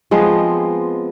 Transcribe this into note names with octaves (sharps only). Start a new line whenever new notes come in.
F3 G#3 B3 C4